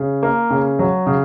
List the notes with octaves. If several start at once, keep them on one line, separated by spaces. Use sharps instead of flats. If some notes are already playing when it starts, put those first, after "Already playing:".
Already playing: C#3
A#3
C#3
F#3
C#3